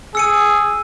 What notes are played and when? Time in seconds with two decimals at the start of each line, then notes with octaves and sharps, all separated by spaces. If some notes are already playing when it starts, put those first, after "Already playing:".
0.15 G#4 E6 C#7 D#7